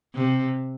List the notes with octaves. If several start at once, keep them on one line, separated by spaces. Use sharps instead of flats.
C3